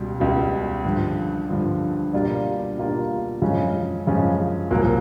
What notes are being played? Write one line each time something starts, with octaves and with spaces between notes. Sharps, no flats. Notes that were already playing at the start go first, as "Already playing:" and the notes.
Already playing: C#2 B2 G3
C#2 B2 G3
G2 D3 F3
G2 D3 F3
B2 G3 A#3 D4 F4
B2 G3 A#3 D4 F4
F#2 C#3 F3 G#3 C#4
F#2 C#3 F3 G#3 C#4
C2 A#2 F#3 A#3